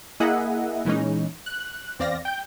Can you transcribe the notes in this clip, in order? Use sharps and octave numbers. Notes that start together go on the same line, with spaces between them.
A#3 E4 G#4 D#5 E5 F#5
A#2 E3 G#3 C#4 D#4
F#6
E2 C4 D5 F5 A#6
G5 G6